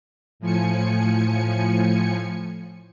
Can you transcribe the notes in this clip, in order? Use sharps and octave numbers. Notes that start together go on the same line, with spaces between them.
A2 F3 G#5 C#7